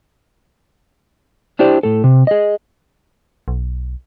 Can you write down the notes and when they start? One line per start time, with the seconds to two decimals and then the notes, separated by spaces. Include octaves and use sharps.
1.59 D4 E4 G4 C5 D5
1.83 A2 A4
2.04 C3
2.27 G#4 D#5
3.48 B1